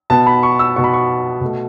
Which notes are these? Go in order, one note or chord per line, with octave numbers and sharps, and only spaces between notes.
B2 B3 A5
B5
C#6
E6
B2 B3 C#6
B5
C#6
B2 A3